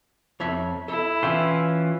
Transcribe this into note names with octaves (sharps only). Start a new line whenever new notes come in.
F2 C#5 E5
E4 A4
E3 C#4 F4 E5 G5